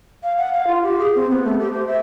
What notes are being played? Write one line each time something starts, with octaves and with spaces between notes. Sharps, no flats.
F5
F#5
F5
F4
G4
G#4
C4
B3
A3
G4
C5
E5